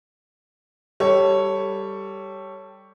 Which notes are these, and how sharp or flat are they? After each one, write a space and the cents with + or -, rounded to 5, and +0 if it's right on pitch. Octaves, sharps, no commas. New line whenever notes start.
G3 +0 A4 +10 C#5 +0